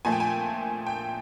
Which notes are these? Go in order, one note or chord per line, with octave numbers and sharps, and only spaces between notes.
A#2 F3 A3 G#5
G5
G#5
G5